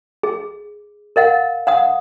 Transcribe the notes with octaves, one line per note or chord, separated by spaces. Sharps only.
G#4
A#4 D#5 F5 F#5
F5 F#5 D#6